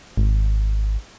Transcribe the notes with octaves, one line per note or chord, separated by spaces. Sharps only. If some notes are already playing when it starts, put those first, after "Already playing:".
G#1